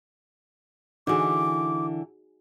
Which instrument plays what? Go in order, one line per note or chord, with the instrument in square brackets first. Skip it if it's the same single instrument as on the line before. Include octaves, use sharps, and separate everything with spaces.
[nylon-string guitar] D3 E3 [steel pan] D#4 F#4 G#4 [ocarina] D6